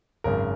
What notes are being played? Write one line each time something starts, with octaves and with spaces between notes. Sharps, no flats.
G#1 F#2 C#3 A#4